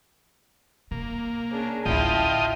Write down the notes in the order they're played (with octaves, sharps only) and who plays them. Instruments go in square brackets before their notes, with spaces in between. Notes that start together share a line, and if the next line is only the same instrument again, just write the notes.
[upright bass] C3 [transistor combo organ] A#3
[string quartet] C#4 G#4 [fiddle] D4
[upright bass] A1 D2 [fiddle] E4 [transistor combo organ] F4 D#5 G5 [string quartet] A5